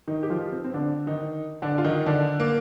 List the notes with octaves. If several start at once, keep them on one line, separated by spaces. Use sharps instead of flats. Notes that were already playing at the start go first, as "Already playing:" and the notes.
D#3 D#4
G4
F3 F4
C4
C4
D3 D4
D#3 D#4
D3 D4
F4
D#3 D#4
D3 D4
A#3